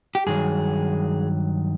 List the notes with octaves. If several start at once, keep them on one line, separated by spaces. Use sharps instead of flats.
G4
G2 D#3 F#3 G#4